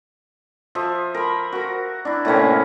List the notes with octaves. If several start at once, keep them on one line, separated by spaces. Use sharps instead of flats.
F3 E5
A#4 B5
F#4 A#4
D4 E4
A2 C3 A#3 C#4